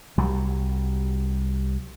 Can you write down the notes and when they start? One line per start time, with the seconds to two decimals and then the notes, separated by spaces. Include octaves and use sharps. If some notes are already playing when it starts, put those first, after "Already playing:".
0.18 C2 F#3 G3